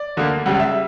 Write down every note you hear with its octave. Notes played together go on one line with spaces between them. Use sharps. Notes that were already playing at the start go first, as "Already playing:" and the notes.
Already playing: D5
D2 D3 A#3
C#2 C#3 G3 F#5
E5